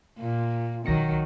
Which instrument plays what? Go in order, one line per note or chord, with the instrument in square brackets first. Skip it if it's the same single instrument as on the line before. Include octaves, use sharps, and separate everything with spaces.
[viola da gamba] A#2
[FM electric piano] B1 A#6 C#7 [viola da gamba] D#3 F#3